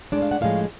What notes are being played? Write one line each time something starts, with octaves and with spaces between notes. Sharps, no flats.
A2 G#3 D4 D5
F5
F#5
A2 F3 G#3 C#4 F5